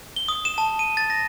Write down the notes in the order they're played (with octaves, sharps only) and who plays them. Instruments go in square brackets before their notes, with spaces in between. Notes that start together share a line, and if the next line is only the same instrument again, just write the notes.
[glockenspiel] G7
D#6
E7
A5
D#7
A6
A#6